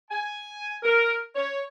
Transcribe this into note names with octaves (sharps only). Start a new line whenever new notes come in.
G#5
A#4
C#5